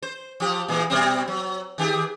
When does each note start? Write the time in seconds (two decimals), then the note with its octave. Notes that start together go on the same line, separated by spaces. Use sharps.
0.02 C5
0.40 F3 G4
0.68 A#2 E3 G#3
0.90 B2 G3 C4
1.28 F#3
1.78 D#3 G4 G#4